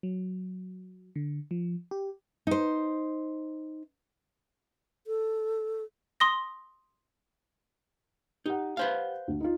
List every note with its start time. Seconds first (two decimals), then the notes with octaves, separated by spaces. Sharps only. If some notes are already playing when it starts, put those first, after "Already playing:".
0.03 F#3
1.16 D3
1.51 F3
1.91 G4
2.47 D#4 C5
5.07 A4
6.20 C6 D#6 A#6
8.46 D#4 G4 F#5
8.77 B4 C5 F5
9.28 D2
9.40 D#4 F4